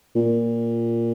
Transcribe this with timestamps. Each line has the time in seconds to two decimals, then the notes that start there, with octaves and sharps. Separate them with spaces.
0.15 A#2